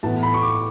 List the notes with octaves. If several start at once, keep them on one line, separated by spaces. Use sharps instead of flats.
A2 E3 B3 A5
B5
C#6
D6